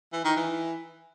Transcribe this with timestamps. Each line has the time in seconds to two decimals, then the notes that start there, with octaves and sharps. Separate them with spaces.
0.13 E3
0.25 D#3
0.36 E3